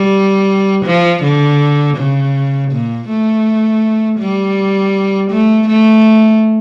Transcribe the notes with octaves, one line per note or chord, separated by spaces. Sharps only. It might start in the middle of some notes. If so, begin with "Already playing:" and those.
Already playing: G3
F3
D3
C#3
A#2
A3
G3
A3
A3